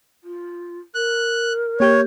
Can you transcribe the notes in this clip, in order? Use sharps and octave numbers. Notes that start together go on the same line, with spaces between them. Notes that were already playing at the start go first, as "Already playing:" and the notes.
F4
A#4 F#6
A#3 G4 C#5 G6